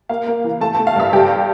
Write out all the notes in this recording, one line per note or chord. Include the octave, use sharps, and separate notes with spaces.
A#3 F5
A#3
E3
A3 A5
A5
A3
F5
G2 E5
G2 G4